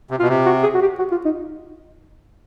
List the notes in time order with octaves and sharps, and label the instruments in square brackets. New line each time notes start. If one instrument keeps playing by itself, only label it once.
[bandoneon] C3
[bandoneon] B2 [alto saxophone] F4
[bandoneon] C3
[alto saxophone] F#4
G#4
F#4
G4
F#4
F4
D#4